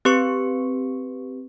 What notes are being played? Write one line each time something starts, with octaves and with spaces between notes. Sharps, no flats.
C4 G4 B4 C#6 C#7